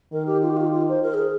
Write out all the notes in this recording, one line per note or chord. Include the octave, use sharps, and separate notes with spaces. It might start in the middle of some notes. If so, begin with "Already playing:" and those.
D#3 A#4
G4
F4
G4
F4
F4
C5
A#4
G#4